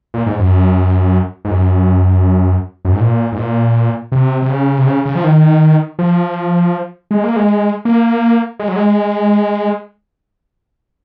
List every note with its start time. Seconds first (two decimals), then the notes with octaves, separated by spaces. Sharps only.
0.14 A#2
0.26 G#2
0.40 F#2
1.45 G#2
1.50 F#2
2.85 F#2
2.93 G#2
3.00 A#2
3.32 G#2
3.38 A#2
4.12 C3
4.42 C3
4.49 C#3
4.78 C3
4.86 C#3
5.06 C#3
5.15 F3
5.24 D#3
5.99 F3
7.11 G#3
7.24 A#3
7.36 G#3
7.85 A#3
8.59 G#3
8.68 F#3
8.76 G#3